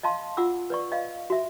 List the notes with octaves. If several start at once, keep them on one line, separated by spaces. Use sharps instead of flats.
D#5 F5 A5 C6
F4 F#5 D6 E6
B4 D5 C#6
D#5 F5
F#4 E5